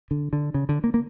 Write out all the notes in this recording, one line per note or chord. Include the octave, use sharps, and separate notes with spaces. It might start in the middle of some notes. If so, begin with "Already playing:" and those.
D3
D3
C#3
D3
A#3
A#3